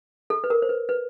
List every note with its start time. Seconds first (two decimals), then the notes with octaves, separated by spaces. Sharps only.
0.30 A4
0.44 B4
0.50 A#4
0.62 C5
0.69 B4
0.89 B4